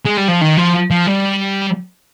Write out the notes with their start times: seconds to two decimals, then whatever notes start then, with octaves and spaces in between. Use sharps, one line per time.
0.06 G#3
0.18 G3
0.29 F3
0.42 D#3
0.57 F3
0.90 F3
1.07 G3